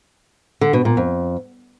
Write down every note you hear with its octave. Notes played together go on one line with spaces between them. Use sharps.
D3
B2
A#2
F2